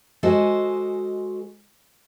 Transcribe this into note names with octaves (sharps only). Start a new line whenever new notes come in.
G#3 F#4 A4 C5 D#5 G#5